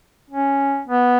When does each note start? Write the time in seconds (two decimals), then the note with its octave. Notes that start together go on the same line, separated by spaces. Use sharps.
0.30 C#4
0.88 B3